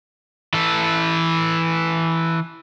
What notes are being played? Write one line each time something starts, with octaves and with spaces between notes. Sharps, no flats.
E3 A4